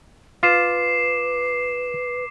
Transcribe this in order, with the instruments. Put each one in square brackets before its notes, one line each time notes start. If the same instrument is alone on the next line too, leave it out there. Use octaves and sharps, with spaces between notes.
[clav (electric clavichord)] F4 [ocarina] B4 [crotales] D6 C7 E7